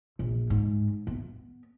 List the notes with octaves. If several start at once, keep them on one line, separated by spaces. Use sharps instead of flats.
A#1
G#2
B3